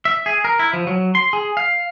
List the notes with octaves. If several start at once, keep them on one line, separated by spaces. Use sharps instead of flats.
E5
G#4
A#4
E4
F3
F#3
C6
G#4
F5